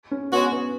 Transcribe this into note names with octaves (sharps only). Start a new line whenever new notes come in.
C#4
G#3 B3 C#4 F#4
B3